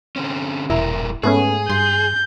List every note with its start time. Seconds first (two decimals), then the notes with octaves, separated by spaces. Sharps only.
0.16 D3 C4 C#4
0.70 E1 G2 A#2 E4 A#4
1.23 G#2 A3 B3 C#4 G#4
1.70 G2 C6 G6